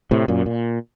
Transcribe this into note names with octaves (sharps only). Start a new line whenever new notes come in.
A2 C3
F#2 A#2
A#2